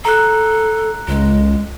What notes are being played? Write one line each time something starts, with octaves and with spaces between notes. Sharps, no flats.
A4 A#5 F#6
C#2 G#3